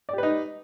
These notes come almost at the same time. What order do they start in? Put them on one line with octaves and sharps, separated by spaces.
D5 G4 B4 D#4